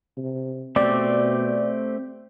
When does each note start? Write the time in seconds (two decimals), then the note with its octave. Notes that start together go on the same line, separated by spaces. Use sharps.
0.17 C3
0.76 B2 A3 C4 G4 D5